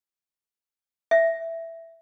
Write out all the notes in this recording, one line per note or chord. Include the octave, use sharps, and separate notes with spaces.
E5